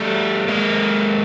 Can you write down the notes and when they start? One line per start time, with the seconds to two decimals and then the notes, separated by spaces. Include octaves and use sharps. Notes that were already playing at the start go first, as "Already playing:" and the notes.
Already playing: G3 A3
0.48 G#3 A#3